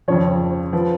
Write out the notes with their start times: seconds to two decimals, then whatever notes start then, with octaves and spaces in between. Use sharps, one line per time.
0.08 F2 C#3 F3 C#5
0.73 F3 B4